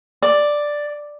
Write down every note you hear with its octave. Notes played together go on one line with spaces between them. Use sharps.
D5